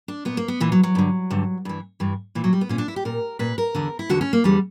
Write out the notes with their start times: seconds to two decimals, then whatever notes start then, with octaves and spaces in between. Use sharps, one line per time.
0.08 D4
0.25 A#2 B3
0.37 A#3
0.48 B3
0.60 A#2 E3
0.72 F#3
0.83 F#3
0.95 G2 D3
1.30 G2 D3
1.65 G2 E3
2.00 G2 E3
2.35 A#2 E3
2.44 F#3
2.53 G3
2.61 B3
2.69 A#2 C#4
2.78 D4
2.88 E4
2.96 G4
3.05 A#2 A#4
3.39 A#2 B4
3.58 A#4
3.75 E2 D3
3.99 E4
4.10 E2 D3 F#4
4.21 C#4
4.33 A#3
4.44 E2 D3 G3